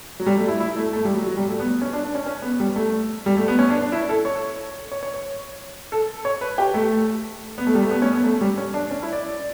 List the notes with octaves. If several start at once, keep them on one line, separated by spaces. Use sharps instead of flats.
F#3
G3
A3
E4
E4
A3
A3
G3
F#3
F#3
G3
A3
B3
C#4
D4
D4
C#4
C#4
B3
G3
A3
G3
A3
B3
C#4
D4
D4
E4
A4
C#5
C#5
C#5
C#5
A4
C#5
B4
G4
A3
B3
A3
G3
A3
B3
C#4
B3
A3
G3
C#4
D4
C#4
E4
D5